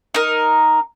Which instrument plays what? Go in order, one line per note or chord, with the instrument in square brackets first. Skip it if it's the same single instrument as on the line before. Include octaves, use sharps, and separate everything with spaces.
[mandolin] D#4 A#4